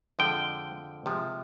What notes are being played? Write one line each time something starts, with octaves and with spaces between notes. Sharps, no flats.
F2 D3 F3 G#3 G5
C3 F3 G#3